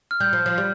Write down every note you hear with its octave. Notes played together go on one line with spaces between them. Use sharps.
F6
G3 G6
F3
F3
G3